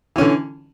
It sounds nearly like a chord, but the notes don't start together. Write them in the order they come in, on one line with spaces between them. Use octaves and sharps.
E3 C#4 D3